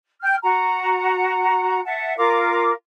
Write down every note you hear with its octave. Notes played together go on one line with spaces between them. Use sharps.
G5 F6 G6
F#4 F#5 A#5
E5 F#5 A5
F4 A#4 F5 D6